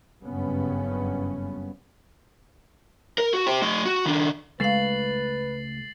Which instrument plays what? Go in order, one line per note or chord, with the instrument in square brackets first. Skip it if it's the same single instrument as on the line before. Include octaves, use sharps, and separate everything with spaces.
[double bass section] F#1 G2 C#3 B3 C#4
[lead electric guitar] A#4
F#4
G4 C5
A3 D#5
F#4
D#3 D4
[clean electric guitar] C#2 A3 [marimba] G#3 F5 [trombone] B4 [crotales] A6 C7 F#7